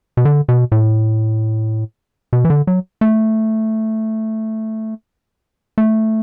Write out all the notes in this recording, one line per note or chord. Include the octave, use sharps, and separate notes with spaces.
B2
D3
B2
A2
B2
E3
D3
F#3
A3
A3